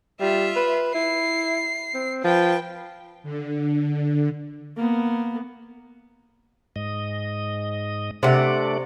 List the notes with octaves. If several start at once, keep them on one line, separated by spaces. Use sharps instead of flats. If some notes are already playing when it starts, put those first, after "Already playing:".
G3 F4 E5
B4
E4 C7
C4
F3 B4 G5
D3
A#3 B3
G#2 D#5
C3 A3 D4 D5 F#5